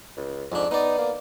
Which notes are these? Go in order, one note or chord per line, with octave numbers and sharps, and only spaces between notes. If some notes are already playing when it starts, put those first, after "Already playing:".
C#2
F2 G#2 D4
B3 D#4 D5
A#3